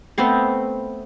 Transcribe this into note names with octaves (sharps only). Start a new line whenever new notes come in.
A3 B3 C4 F5